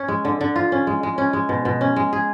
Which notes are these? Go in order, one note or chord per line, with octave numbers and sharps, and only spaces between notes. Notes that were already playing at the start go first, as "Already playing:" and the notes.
Already playing: C#4
G#3
D3
D3
F4
C#4
G#3
G#3
C#4
G#3
B2
B2
C#4
G#3
G#4